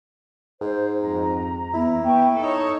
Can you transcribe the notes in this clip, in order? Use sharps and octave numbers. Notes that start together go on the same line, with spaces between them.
G#2 C5
F2 A#5
E2 E4
B3 G5 C#6
D#4 A4 C#5